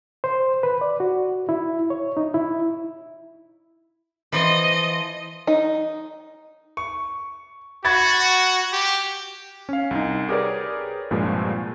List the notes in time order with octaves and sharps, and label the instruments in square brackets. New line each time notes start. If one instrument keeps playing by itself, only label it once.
[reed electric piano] C5
B4
D5
F#4
E4
C#5
D#4
E4
[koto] E3 F3 [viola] D#5
[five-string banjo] D#4
[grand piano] C#6
[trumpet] F#4 [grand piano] B5 G#6 A6
[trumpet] G4
[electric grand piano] C#4 F5
C2 D#4
G4 G#4 A#4 B4 C#5 D5
C2 G2 A#2 F3 G#3